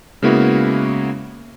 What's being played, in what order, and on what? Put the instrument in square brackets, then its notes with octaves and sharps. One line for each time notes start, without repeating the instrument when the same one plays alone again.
[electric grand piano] C#3 G#3 A#3 B3 E4 F#4